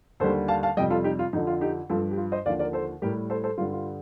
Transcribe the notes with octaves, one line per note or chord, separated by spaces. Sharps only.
D#2 D3 G3 A4 C5
F5 A5
F5 A5
F2 C3 G3 D#5 G5
F4 A4
D#4 G4
F4
F2 D3 F3 D#4
F4
D#4 G4
G2 F3 F4 A4
G4
F4
C5 D#5
D#2 D3 F3 D5 F5
A#4 D5
A4 C5
A2 G3 G4 A#4
A4 C5
A4 C5
G2 D3 G3 F4
F4